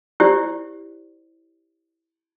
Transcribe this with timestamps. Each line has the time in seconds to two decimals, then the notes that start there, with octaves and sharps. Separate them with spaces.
0.20 E4 G4 C5 D5